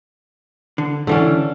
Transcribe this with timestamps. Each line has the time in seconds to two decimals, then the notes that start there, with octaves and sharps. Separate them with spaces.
0.78 D3
1.07 C#2 D3 E3 C#4 D4